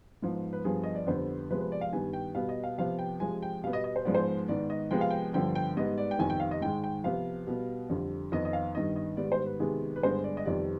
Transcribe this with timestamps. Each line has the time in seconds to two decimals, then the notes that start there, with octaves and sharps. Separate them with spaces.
0.22 G#2 F3 B3
0.53 B4
0.64 G2 F3 B3 G#4
0.83 D#5
0.95 D5
1.07 F2 D3 G3 B3 C5
1.50 C3 F3 G#3 B3 B4
1.60 B4
1.72 D5
1.81 F5
1.92 G2 D#3 G3 B3 G#5
2.13 G5
2.35 B2 G3 B3 F5
2.49 D#5
2.64 F5
2.78 C3 F3 B3 F5
2.99 G5
3.20 C3 F3 G#3 G#5
3.42 G5
3.63 B2 G3 B3 F5
3.73 D#5
3.84 D#5
3.96 C5
4.05 G#2 F3 G#3 B3 D5
4.14 C5
4.48 G#2 D#3 B3 D5
4.70 D#5
4.91 C3 F3 G#3 B3 G5
5.01 F5
5.10 G5
5.33 G2 D3 F3 B3 G5
5.55 G5
5.77 G#2 G3 B3 D#5
5.98 D5
6.11 G5
6.19 F2 C3 D#3 G3 B3 G#5
6.30 G5
6.40 F5
6.51 D#5
6.62 G#2 D#3 G#3 G5
6.84 G5
7.04 C3 F3 B3 F5
7.47 B2 G3 B3
7.90 F2 D3 G3
8.32 F2 D#3 B3 D#5
8.45 D#5
8.53 F5
8.75 G2 D#3 B3 D#5
8.96 D#5
9.17 G#2 D#3 G3 B3 D5
9.32 C5
9.46 B4
9.60 C3 D#3 G#3 B3 G#4
9.96 B4
10.03 G2 D3 G#3 B3 C5
10.24 D5
10.37 D#5
10.45 F2 C3 D#3 G3 B3 D5